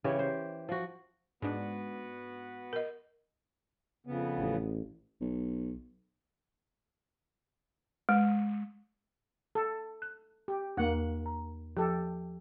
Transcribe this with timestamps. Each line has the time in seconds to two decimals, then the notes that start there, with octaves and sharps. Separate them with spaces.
0.04 C#3 E3 G4 C#5
0.19 C5
0.69 F3 F#4
1.42 G#2 B3 D4 F#4 B4
2.73 A#4 D#5
4.07 F2 C#3 B3
4.38 A1
5.21 B1
8.09 G#3
9.55 A4
10.02 F#6
10.48 G4
10.77 E2 A#3 F#5
11.26 A#5
11.77 F3 G4 A4